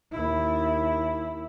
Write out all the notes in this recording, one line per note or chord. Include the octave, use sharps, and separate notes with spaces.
D#2 E4